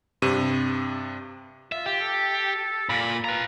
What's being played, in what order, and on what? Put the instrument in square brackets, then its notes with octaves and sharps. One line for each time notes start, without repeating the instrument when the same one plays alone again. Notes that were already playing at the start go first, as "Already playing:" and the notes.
[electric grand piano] G2 C3 D#7
[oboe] F4 [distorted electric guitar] E5
[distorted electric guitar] G4
[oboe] A4
[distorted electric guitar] A#2 [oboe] B5
[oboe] F4 [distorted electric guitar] B4 A#5